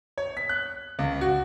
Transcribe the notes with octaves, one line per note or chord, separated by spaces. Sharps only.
C#5
B6
F#6
C#2
F#4